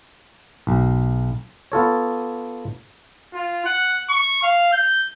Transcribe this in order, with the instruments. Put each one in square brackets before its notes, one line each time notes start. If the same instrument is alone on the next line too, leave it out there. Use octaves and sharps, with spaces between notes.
[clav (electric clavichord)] B1
B3 F4 A4 C#5
[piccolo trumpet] F4
F#5
C#6
F5
G6